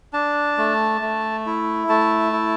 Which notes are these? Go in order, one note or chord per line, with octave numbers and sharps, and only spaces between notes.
D4 A5
A3
A3
E4
A3 A5
E4